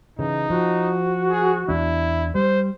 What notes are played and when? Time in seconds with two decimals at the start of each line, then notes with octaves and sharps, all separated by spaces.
0.19 C#3 E3 D#4
0.50 F3 F#4
1.30 G#4
1.69 E2 D4 E4
2.35 G3 C5